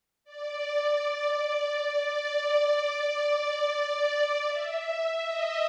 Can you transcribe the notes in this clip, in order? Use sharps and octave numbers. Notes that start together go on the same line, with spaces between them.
D5
D5
E5
D#5